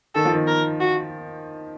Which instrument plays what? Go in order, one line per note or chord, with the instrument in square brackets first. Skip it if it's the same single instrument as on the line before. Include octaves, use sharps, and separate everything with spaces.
[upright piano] D#3 [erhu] A4
[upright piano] F3
D#3
[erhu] A#4
F#4